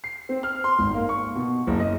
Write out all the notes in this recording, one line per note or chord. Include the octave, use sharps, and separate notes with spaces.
C7
C4
F6
C6
G#1
A#3
C#6
B2
F#1
D#5